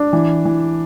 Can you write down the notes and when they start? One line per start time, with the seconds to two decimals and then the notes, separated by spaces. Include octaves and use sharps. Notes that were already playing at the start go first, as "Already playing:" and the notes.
Already playing: D4
0.13 E3
0.45 E3